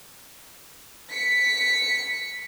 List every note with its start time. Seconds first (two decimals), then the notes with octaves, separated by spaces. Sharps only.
1.10 B6 C#7